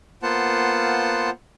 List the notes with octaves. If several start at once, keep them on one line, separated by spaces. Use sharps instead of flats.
A#3 B3 F4 C5 F#5 A5